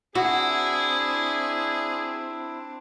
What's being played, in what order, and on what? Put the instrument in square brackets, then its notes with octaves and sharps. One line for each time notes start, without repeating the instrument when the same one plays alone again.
[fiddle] C4 D4 [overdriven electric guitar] E4 [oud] F#4 [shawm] G#4